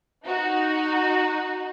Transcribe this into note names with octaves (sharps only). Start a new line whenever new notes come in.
D#4 F#4